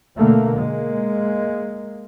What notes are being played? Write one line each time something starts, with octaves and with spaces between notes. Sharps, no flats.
B2 D3 A3 A#3
G#3 A#3